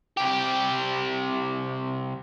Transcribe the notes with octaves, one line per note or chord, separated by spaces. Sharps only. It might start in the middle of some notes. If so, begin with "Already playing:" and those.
C2 G4